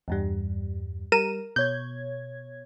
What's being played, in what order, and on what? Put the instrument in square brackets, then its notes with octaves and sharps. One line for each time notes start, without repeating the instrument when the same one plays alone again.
[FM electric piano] E2 G2 G3
[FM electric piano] G3 [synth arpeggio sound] A#4 D#7 E7
[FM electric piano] B2 C#5 G#6 [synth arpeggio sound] G6